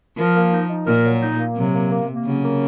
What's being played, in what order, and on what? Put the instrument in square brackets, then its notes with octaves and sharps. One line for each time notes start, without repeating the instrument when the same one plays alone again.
[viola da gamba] F3 [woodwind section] A#4
[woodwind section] A#3
D#4
D#4
[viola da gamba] A#2 [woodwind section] A#4
[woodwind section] F#3
D#4
A#3
[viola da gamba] C3 [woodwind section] F#3
[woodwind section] A#3
A#3
A#3
[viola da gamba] C#3 [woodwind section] F#3
[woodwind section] A#3